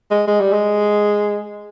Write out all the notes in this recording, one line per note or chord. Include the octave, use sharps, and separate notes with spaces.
G#3
G#3
G3
G#3